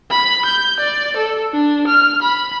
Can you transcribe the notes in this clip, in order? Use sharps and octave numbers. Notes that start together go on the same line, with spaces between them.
B5
G6
D5
A4
D4
F6
B5